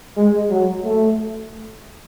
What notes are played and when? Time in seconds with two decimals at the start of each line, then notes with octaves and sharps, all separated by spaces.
0.17 G#3
0.50 F#3
0.85 A3